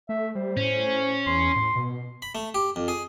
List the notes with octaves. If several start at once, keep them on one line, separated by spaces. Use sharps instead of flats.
A3 E5
G3 C5
A2 C#4
E2 C6
A2
B2
B5
A3
G4
F2
G#4